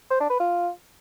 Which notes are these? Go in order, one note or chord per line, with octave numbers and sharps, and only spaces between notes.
C5
D4
B4
F4